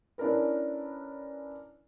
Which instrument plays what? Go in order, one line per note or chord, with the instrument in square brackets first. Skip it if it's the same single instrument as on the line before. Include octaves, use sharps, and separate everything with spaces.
[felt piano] C#4 D4 E4 A#4 B4